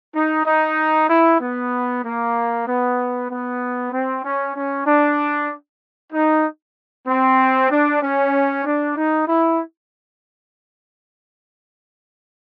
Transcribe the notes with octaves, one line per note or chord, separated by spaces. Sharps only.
D#4
D#4
E4
B3
A#3
B3
B3
C4
C#4
C#4
D4
D#4
C4
D4
C#4
D4
D#4
E4